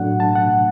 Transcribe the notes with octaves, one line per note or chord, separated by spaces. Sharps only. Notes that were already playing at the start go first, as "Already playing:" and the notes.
Already playing: A2 F#3 A3 D4 F#5
A5
F#5